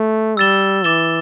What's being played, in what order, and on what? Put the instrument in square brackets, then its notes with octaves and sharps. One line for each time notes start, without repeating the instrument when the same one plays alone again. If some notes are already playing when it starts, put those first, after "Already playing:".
Already playing: [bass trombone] A3
[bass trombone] G3 [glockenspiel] E6 A6 E7 G7
[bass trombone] E3 [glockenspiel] D6 A6 E7 G7